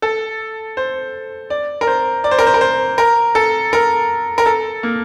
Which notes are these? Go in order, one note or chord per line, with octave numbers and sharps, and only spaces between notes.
A4
C5
D5
A#4
C5
D5
C5
A#4
C5
A#4
C5
A#4
A4
A#4
A#4
A4
A#3